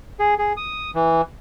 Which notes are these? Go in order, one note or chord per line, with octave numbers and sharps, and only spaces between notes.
G#4
G#4
D#6
E3